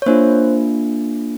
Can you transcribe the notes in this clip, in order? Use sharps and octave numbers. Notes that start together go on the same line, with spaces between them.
C#5
A#3 D4 F4 C5